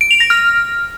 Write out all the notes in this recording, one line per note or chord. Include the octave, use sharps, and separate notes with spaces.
D7
F7
A#6
F6